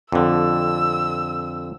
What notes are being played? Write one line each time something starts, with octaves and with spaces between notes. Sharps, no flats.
F2 D3 E6